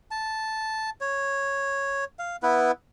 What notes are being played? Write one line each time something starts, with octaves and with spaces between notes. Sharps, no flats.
A5
C#5
F5
B3 E4 B4